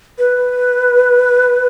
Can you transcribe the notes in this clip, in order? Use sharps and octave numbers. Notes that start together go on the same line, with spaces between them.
B4